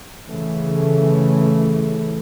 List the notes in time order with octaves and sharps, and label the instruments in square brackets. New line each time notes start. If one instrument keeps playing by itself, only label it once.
[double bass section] C#3 E3 A3